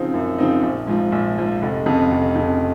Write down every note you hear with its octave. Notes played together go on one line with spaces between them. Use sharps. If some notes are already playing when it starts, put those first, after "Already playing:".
Already playing: C#3 F3 C4 D#4
F#2
C#3 F3 C4 D#4
A#1
G#2 F3
A#1
G#2 F3
F1
F2 C#3
F1
F2 C#3